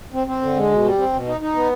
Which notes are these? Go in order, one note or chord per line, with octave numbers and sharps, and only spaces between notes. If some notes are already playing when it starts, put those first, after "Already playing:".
C4
C4
D3
G#3
B2
G3
C4
B2
D#4
D#4
B3